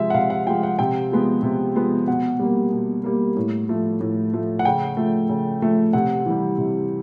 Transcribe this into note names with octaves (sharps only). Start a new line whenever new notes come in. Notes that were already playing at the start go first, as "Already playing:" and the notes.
Already playing: C3 F3 G#3 E5
F#5
C3 F5
F#5
F3 G#3 G5
F#5
C3 G5
F3 G#3 B3
C3
F3 G#3 B3
B2 F#5
G3 A#3
B2
G3 A#3
A2
F3 A3
A2
F3 A3
F#5
C#3 G5
F3 A3
C#3
F3 A3
C3 F#5
E3 G3
C3